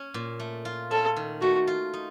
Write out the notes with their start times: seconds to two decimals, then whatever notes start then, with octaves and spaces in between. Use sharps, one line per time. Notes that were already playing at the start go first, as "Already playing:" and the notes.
Already playing: C#4
0.14 A#2
0.40 A3
0.65 F4
0.91 C#4 A4
1.16 D#3
1.42 A3 F#4
1.67 F4
1.94 D#4